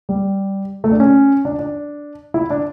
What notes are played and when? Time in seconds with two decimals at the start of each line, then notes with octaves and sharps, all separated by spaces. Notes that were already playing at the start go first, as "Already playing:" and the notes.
0.09 G3
0.84 A3
0.91 D4
1.00 C#4
1.45 D4
1.59 D4
2.34 E4
2.50 D4